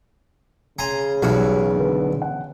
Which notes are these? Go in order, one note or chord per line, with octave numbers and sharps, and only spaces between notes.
C#3 G#5 A#5 C6
B1 E2 G3 F#4 C#5
D3 B3
F#5